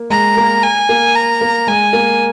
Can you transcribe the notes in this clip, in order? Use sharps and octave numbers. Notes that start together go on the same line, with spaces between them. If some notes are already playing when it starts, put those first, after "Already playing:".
Already playing: A#3
G#3 A#5
A#3
G#5
A#3
A#5
A#3
G#3 G#5
A#3